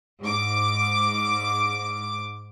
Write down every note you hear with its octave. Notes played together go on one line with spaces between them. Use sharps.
G#2 D6